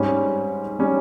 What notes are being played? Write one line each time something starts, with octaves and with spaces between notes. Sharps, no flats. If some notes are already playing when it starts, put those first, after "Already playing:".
Already playing: G#2 G3 C#4
G3 C#4